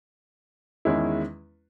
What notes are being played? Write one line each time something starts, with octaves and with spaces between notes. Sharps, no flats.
E2 D#3 G#3 C#4 E4